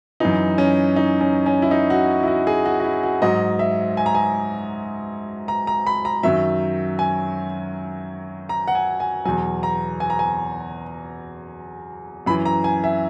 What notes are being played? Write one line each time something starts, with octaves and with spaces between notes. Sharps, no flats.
F#2 E3 D#4
C#4
D#4
C#4
C#4
E4
D#4
F#4
E4
F#4
G#4
F#4
F#4
E4
F#4
G#2 F#3 D#5
E5
G#5
A#5
G#5
A#5
A#5
B5
A#5
F#2 D#3 F#3 E5
G#5
A#5
F#5
G#5
G#5
E2 B2 F#3 G#5
A#5
G#5
A#5
G#5
F#2 E3 B5
A#5
G#5
E5